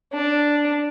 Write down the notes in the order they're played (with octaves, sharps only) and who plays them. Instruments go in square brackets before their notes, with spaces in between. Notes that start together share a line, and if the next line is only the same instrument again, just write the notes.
[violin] D4